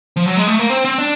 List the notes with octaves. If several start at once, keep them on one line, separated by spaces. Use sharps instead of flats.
F3
F#3
G#3
A3
A#3
C4
C4
D4